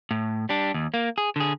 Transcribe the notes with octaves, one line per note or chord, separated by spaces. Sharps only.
A2
G3 D4
D#2
A#3
G#4
D3 G#4